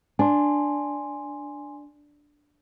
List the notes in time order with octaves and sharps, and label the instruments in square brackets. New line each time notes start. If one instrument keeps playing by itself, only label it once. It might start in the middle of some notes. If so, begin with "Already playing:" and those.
[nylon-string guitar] D4 [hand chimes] G#5 C6